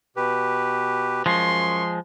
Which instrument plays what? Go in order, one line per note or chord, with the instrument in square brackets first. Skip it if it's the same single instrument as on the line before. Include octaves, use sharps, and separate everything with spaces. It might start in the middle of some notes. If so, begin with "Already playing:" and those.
[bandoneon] B2 G4 B4
[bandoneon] F#2 C#6 [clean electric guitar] F3 G#3 [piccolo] C6